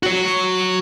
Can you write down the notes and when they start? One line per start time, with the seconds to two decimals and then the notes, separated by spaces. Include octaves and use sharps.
0.03 F#4 C#5